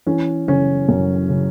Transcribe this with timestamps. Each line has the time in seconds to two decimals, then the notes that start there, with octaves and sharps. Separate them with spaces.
0.07 E3 C#4
0.48 F#1 C#4
0.89 F#2
1.29 C#3